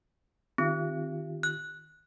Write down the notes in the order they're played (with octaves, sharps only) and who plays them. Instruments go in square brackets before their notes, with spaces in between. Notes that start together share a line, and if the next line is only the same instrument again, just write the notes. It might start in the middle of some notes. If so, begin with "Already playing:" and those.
[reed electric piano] D#3 F4 G4 [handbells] C4
[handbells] F#6